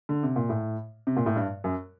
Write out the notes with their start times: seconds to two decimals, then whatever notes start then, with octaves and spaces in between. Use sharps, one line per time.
0.09 D3
0.23 C3
0.36 A#2
0.49 A2
1.07 C3
1.17 A#2
1.26 A2
1.36 G2
1.64 F#2